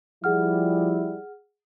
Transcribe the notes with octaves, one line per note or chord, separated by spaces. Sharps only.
F3 G3 E4 G#4 F#5 F6